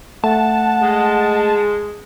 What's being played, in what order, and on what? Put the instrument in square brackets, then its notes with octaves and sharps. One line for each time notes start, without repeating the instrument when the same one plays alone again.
[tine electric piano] A3 [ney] F#5 [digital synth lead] A5
[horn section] G#3